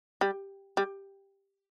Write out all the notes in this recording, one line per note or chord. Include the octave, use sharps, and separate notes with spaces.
G3
G3